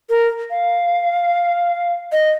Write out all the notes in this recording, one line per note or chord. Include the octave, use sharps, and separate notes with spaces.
A#4
F5
D#5